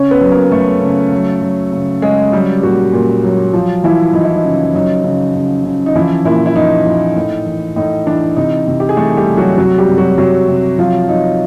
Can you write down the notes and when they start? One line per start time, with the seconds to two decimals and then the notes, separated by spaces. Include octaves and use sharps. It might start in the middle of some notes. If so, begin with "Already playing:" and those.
Already playing: C#3 C#4 C#5
0.11 B3 B4
0.21 F#3
0.32 A#3 A#4
0.51 F#3 A3 A4
0.81 C#3
1.12 F#3
1.42 F#3
1.72 C#3
2.02 C#3 G#3 G#4
2.32 F#3 G3 G4
2.63 A#2 F#3 F#4
2.93 A#2
3.24 F#3
3.53 F3 F4
3.84 E3 F3 E4
4.14 F3 D#4
4.24 E4
4.35 D#4
4.44 C#3
4.74 F#3 D#4
5.04 C#3
5.35 C#3
5.65 C#3
5.86 D#4
5.95 E3 F3 E4
6.25 A#2 E3 E4
6.46 E4
6.55 F3 D#4
6.86 F3
7.16 A2
7.46 E3
7.76 A2 D#4
8.07 E3 D4
8.36 C3 D#4
8.67 C3
8.80 G4
8.89 G#4
8.97 E3 A3 A4
9.17 G3 G4
9.27 C3
9.37 F#3 F#4
9.58 C3 F#3 F#4
9.78 G3 G4
9.88 C3
9.98 F#3 F#4
10.18 C3 F#3 F#4
10.48 C3
10.78 F3 F#3 F4
11.09 F#3 D#4